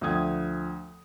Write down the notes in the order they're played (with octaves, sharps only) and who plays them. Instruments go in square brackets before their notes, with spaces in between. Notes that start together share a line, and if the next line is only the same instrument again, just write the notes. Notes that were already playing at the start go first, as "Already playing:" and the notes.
[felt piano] D2 F3 G5 D#6 G#6